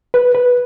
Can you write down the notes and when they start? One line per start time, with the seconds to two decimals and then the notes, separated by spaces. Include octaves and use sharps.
0.14 B4
0.35 B4